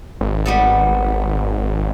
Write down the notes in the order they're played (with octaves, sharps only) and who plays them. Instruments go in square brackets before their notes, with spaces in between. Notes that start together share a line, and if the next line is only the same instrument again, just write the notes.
[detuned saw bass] G#1
[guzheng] G3 B3 A4